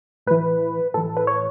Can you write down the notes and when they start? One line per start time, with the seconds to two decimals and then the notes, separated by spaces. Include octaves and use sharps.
0.26 A2 E3 B4
0.94 A2 E3 A4
1.17 B4
1.27 C#5